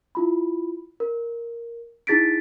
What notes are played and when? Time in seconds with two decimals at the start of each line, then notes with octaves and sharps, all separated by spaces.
0.15 E4 F4 B5
1.00 A#4
2.07 D#4 E4 G#4 A6 B6 D7